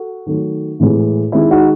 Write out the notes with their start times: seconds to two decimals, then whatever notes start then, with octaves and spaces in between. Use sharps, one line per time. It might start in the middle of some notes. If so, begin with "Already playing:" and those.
Already playing: F#4 A4
0.26 D#3 F#3 A3
0.79 A2 E3 G#3
1.32 D#3 G#3 E4
1.50 D#4 F#4